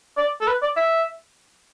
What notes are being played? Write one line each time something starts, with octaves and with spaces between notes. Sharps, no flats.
D5
A4
B4
D5
E5